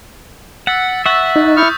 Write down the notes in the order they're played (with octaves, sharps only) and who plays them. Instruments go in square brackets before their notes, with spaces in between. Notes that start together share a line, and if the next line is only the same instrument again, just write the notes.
[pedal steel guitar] F#5 [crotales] E6 A6 B6
[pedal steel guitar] E5 F#5 [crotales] C#6 F#6 A6
[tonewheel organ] D#4
[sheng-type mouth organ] E4 C#6 F6 [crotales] D#6 G6